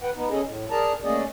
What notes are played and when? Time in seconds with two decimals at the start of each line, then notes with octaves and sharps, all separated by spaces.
0.02 B4 F#5 G5
0.16 B3 D#4
0.30 C#4 G#4 A4 D#5
0.44 A2
0.71 G#4 A#4 D5 A5 A#5
1.04 A3 A#3 C#4 G#4 D5 D#5